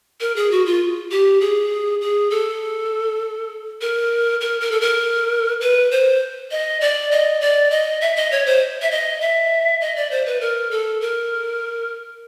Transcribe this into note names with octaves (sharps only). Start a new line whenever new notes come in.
A#4
G#4
F#4
F4
G4
G#4
G#4
A4
A#4
A#4
A#4
A4
A#4
B4
C5
D#5
D5
D#5
D5
D#5
E5
D#5
C#5
C5
E5
D#5
E5
D#5
D5
C5
B4
A#4
A4
A#4